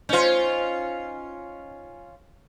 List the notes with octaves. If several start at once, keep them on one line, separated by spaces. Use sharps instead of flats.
C#4 D#4 F4 C5